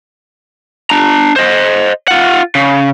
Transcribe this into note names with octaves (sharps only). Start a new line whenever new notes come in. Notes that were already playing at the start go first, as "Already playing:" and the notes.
D4 A#5
C5 D#5
F4 F#5
C#3